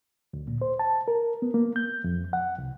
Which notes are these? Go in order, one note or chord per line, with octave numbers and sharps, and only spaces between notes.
D2
A#2
C5
A5
A#4
B3
A#3
G6
F2
F#5
C2